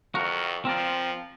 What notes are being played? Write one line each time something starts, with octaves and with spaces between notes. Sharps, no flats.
F2 F#4 A#4
F3 C4 A#4 D5